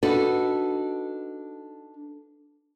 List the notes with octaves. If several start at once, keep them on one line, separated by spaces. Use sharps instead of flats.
D4 D#4 F#4 A4 B4